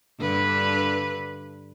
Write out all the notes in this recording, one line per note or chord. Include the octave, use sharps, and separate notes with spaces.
G2 D3 B4